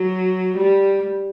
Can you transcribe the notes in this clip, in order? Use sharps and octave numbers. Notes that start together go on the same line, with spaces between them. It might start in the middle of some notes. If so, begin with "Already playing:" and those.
Already playing: F#3
G3